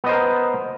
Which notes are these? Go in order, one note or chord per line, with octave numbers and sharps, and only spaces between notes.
B3 A#4 C5 D#5